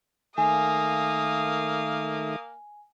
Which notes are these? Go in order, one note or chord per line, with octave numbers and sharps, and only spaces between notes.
D#3 A3 A#3 E5 F5 G#5 D#6